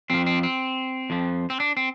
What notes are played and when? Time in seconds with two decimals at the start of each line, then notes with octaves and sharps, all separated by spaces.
0.10 F2 F3 C4
0.26 C4
0.43 C4
1.10 F2 F3
1.50 C4
1.60 D4
1.77 C4